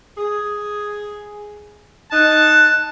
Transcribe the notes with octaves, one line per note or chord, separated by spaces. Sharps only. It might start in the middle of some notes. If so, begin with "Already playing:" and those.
G#4
D#4 A5 F#6